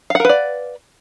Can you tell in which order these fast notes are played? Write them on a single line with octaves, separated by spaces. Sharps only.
F5 F#5 A#4 B4 D5